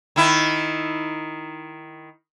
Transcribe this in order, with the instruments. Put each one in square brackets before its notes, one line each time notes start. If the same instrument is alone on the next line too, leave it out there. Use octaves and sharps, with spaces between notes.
[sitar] D#3 E4